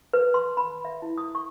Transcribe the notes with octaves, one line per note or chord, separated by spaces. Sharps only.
B4
C6
B5
E5
E4
D#6
C#6